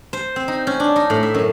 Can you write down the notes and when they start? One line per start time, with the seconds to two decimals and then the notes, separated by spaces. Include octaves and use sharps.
0.13 C5
0.36 C4
0.48 D#4
0.67 C#4
0.80 D4
0.96 D#4
1.10 A2
1.23 E5
1.34 F#2